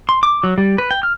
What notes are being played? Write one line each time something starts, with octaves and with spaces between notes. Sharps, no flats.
C6
D6
F#3
G3
B4
G5
F6